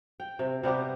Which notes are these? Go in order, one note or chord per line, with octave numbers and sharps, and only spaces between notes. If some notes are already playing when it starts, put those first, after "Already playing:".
G5
C3
C3 G3 B3 G4